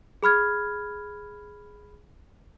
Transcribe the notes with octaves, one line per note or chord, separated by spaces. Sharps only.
G#4 B5 F6 G#6